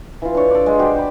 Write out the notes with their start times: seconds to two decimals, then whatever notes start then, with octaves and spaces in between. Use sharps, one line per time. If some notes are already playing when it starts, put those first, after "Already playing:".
0.22 E3 F4
0.35 D4 C#5
0.50 A4 D5
0.66 G#3
0.79 F#4 G4 C5
0.96 G4 B4